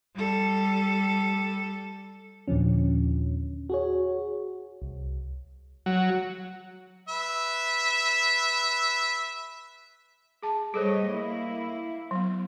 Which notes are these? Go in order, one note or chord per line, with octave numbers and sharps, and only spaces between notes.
G3 A4
D#2 A#2 D3 F3 C#4
F#4 G#4 C#5
C2
F#3
B4 E5
G#4 A5
G3 G#4 A4 C5 C#5 D#5
A#3 E4
F#3 B3